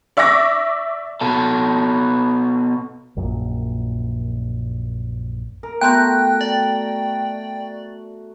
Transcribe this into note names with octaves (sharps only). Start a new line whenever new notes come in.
D5 E5 C#6 D6 A#6
B2 A4
A#1 F#2 A#2
A#4
A3 B3 F#4 G5 C6 F#6 G6
D5